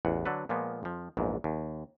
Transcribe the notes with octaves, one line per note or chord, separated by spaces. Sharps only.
A1 E2 F#5
D3 F#3 D4 A4 B4
A#2 F3 G#3 A#3 B3
F2 F3
A#1 E2 G#2
D#2